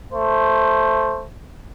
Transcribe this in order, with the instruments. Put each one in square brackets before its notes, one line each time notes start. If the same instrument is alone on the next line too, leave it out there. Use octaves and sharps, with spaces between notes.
[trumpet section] A3 C5